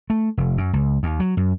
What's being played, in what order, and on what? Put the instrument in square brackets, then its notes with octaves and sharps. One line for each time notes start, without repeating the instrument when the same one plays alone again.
[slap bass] A3
F1
F#2
C#2
D#2
F#3
F#2